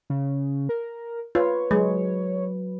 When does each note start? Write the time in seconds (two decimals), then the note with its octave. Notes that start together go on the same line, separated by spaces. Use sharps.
0.10 C#3
0.69 A#4
1.35 F4 B4 C#5
1.71 F#3 G#3